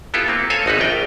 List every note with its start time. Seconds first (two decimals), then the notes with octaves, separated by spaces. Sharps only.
0.14 B3 E4 F4 G4 A4
0.28 A#3 C4
0.50 A4 C#5 F5 G#5
0.66 G#1 D#4 F#4 B4
0.79 A#1 F4 G5